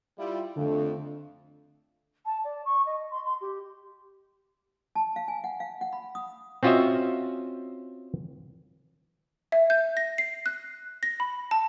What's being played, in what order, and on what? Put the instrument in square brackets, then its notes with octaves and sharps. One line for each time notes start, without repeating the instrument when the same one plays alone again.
[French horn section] G3 E4 F4
[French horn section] F2 A3 [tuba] D3
[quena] A5
D5
C#6
D#5
C6
C6
G4
[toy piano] A5
F5
G#5
F#5
F5
F#5
B5
D#6
[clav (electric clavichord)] C4 C#4 F4 F#4 D#5 E5
[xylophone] E5
G6
A#6
C7
F#6
A#6
B5
A5